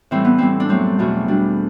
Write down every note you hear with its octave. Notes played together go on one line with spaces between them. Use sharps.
A2 E3 G3 C4
B3
A2 G3 C4
D4
F#2 F#3 A3 C4
E2 B2 F#3 A3
B2 G3 D4